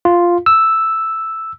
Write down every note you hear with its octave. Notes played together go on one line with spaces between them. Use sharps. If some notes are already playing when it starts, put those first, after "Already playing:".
F4
E6